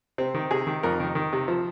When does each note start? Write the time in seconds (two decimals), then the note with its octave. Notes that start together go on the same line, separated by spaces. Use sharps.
0.18 C3 C4
0.34 D#3
0.51 C3 G#4
0.67 D#3
0.83 F2 A#4
1.00 D#3
1.15 D#3
1.33 C3
1.48 F3